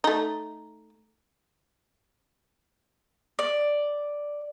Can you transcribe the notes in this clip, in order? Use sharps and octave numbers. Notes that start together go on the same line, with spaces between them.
A3 D#4
D5